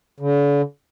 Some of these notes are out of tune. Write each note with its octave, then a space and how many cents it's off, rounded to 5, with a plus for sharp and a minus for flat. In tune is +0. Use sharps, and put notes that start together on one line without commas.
D3 -45